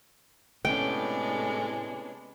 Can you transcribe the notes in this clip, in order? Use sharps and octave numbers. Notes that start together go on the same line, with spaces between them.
A2 C3 G#3 B3 C#4 D4 G5